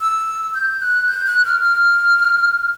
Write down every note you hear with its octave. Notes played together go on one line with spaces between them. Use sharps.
E6
G6
F#6
G6
F#6
F6
F6